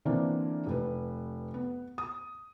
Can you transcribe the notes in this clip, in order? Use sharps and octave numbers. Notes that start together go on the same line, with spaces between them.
D3 E3 A#3 C4 D4
F1 B4
B3
D#6